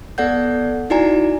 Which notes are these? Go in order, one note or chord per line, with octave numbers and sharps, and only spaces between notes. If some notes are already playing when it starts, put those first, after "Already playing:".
B3 A4 D5 F#5 G6
D#4 E4 F#4 D5 G#5 A#5